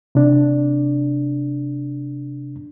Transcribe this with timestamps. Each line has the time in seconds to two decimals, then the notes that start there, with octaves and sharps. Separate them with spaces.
0.15 C3 D4